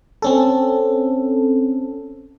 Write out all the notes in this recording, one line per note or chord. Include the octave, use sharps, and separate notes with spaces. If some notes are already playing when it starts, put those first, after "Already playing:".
C4 C#4 A4